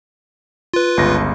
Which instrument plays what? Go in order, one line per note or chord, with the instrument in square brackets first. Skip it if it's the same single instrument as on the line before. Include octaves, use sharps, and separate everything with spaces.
[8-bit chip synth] F4 B4
[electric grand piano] G1 C#2 A#6